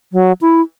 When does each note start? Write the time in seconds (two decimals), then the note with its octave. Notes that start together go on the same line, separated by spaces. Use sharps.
0.13 F#3
0.41 E4